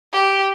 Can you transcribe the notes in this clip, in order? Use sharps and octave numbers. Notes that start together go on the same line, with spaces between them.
G4